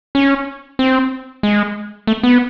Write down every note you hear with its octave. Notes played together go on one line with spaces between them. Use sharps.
C#4
C4
G#3
A3
B3